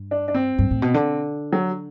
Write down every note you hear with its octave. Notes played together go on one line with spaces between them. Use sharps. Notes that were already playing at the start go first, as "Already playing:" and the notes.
Already playing: G2
D4
D4
C4
G2
A2
B2
D3
F#3